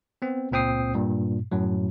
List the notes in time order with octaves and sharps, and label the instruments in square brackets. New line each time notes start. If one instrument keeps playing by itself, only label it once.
[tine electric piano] B3 C4
C#2 A#2 C4 G5 D#6 C7
G2 A#2
F#2 A2 F#3